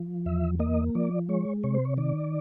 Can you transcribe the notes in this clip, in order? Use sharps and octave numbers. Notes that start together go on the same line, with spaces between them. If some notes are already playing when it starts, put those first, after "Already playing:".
Already playing: F3
E2 E5
A#3 D#5
F3 D5
G#3 C#5
C3 C#5
C5
C#5
D#3 D5